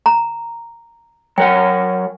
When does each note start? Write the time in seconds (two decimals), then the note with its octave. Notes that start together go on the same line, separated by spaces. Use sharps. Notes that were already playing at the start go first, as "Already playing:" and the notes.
0.06 A#5
1.38 F#3 A#4 F#5 G5